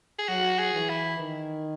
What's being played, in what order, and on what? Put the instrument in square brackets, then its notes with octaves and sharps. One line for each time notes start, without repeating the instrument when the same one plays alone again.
[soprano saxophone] G#4
[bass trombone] F#3 [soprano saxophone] F#4
[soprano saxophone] G#4
[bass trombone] E3
[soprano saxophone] E4
[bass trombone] D#3